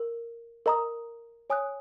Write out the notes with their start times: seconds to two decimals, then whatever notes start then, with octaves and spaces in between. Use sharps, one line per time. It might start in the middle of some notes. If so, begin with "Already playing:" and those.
Already playing: A#4
0.66 A#4 D#5 A#5 D#6
1.50 C#5 G#5 D#6 F#6